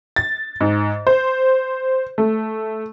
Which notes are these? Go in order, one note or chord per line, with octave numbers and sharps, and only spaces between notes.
A6
G#2
C5
A3